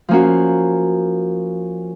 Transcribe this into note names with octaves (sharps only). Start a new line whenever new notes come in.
F3 A#3 C#4 F#4